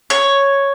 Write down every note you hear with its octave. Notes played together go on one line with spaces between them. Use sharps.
C#5